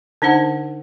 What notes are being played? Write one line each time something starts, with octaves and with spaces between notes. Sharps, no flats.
D3 D4 D#4 C5 F#5